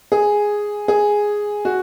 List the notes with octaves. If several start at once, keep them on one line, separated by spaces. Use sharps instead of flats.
G#4
G#4
F#4